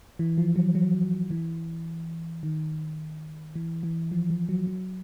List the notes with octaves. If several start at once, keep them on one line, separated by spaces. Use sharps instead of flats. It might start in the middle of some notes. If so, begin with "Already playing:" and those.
E3
F3
F#3
F#3
E3
D#3
E3
E3
F3
F3
F#3
F#3